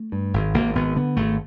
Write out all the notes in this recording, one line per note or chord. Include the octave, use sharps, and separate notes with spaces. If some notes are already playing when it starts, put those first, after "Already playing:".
Already playing: A3
G2
G#1
G#1 A#3
G#1 B3
D3 B3
G#1 A3